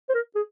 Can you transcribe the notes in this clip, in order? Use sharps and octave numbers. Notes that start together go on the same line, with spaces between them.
C5
A#4
G#4